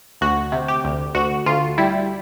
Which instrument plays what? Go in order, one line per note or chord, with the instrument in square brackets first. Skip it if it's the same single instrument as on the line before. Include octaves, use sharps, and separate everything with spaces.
[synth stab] D2 F#4
C3
G4
D2
D2 F#4
D2 F4
G3 E4